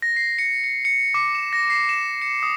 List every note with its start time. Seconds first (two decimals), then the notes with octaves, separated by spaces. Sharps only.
0.02 A#6
0.16 C7
0.39 C#7
0.64 C#7
0.85 C#7
1.14 D6
1.35 E7
1.53 A#6
1.70 C7
1.89 E7
2.22 C#7
2.43 D#6